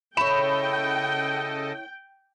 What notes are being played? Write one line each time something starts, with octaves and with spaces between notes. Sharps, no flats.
C#3 E4 A4 C#5 D#5 G5 B5 E7